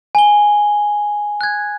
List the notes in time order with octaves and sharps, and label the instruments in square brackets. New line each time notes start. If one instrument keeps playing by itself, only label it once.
[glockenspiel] G#5 G7
F#6 G#6